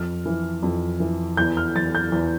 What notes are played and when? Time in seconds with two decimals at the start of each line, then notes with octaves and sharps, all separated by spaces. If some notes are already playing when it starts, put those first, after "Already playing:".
Already playing: F2 F6
0.26 E3
0.63 F2
1.00 E3
1.37 E2 G6
1.57 F6
1.76 E2 A6
1.95 G6
2.12 E2